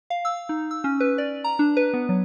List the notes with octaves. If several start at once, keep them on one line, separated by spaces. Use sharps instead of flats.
F5
E6
D#4
E6
C#4
B4
D5
A#5
D4
B4
B3
F#3